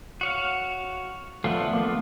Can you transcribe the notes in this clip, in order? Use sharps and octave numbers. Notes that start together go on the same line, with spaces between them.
F#4 C#5 F5
F3 A3 B3 D4 F4
A3 A#3